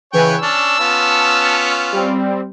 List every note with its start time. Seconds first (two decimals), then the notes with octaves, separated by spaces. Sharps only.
0.13 C#3 E3 B4 C#5 G5 G#5
0.42 C#4 D4 A5 E6
0.80 B3 C#4 F4
1.92 G3 C4